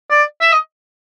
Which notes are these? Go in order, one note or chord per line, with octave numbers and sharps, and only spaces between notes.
D5
E5
D#5